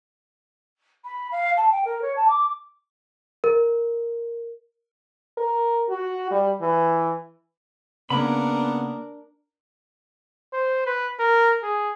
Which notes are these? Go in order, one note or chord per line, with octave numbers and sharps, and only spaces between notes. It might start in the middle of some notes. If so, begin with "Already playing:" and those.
B5
F5
A5
G5
A#4
C#5
A5
D6
A#4
A#4
F#4
G3
E3
C#3 A#3 B3 D4 A#4 B5
C5
B4
A#4
G#4